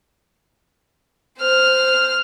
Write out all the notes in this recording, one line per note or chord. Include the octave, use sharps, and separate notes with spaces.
C5 F6